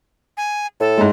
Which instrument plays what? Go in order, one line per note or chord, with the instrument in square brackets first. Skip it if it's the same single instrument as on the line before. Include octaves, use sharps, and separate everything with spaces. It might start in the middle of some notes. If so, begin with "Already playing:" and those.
[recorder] G#5
[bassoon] A2 [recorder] A4
[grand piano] G#2 G#3